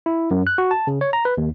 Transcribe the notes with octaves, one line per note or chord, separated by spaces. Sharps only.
E4
F#2
F#6
F#4
A5
C#3
C#5
A#5
B4
D#2